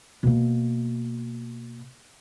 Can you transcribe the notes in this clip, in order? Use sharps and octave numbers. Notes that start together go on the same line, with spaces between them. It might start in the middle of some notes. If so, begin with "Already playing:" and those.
B2 A#3